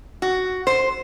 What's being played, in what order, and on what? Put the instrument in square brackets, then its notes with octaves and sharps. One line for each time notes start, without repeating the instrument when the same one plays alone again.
[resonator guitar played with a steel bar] F#4
C5